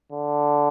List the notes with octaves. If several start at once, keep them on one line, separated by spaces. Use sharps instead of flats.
D3